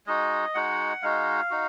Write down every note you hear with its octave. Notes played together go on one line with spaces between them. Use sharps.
G#3 D#4 F#4 D#5
G#3 D#4 F#4 F#5
G#3 D#4 F#4 F5
D#4 F#4